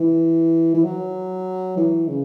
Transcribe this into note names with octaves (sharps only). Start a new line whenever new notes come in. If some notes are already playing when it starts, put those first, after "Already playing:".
Already playing: E3
E3
F#3
E3
C#3